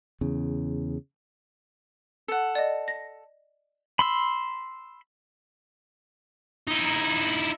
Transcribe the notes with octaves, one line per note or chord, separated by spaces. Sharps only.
E2 C#3
A4 F#5
D5 D#5
A#6
B5 C6 E6
D#4 E4